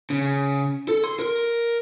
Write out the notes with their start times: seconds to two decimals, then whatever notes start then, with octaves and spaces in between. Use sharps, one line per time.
0.10 C#3
0.88 A4
1.04 C6
1.19 A#4